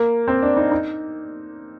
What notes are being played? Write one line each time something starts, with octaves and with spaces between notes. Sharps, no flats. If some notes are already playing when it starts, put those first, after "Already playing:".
Already playing: A#3
C4
D4
D#4
D#4